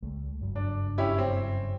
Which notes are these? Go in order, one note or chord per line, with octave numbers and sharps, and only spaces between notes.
C#2 G#3 A3
F#1 G2 F#3
D4
C#4 E4 G4
C4